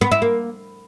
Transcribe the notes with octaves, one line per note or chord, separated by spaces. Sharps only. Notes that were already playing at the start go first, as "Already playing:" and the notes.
B3
E4
A#3